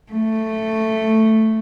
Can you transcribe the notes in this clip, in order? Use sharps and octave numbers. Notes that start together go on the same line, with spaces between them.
A3